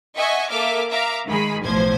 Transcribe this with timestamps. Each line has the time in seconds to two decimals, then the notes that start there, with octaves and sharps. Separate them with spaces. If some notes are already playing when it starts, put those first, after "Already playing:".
0.16 D#5 E5 F#5 G#5 C#6
0.51 A#3 A4 E5 D6 F6
0.90 E5 F5 A#5 D6
1.26 D#3 G#3 G#4 B5
1.64 B1 E2 A2 F3 C5 G#6